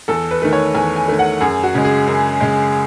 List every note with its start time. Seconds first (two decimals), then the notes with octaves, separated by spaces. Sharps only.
0.08 E2 A4
0.31 B4
0.42 D#3 A3
0.53 C#5
0.75 E2 G#5
0.96 G#5
1.08 D#3 A3
1.19 F#5
1.41 F#2 G#4
1.64 F#4
1.75 C#3 G#3
1.85 G#4
2.07 F#2
2.41 C#3 G#3